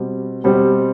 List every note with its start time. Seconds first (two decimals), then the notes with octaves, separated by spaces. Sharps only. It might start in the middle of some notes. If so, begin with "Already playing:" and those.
Already playing: B2 G3 C4
0.44 B2 G3 C4 G4